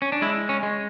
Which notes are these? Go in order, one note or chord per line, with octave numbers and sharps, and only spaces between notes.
C#4
D4
G#3 E4
C#4
G#3